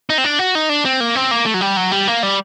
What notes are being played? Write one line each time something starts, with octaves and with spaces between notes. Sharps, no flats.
D#4
C4
D4
F#4
D#4
D4
C4
A#3
C4
A#3
A3
F#3
G3
F#3
G3
A#3
G3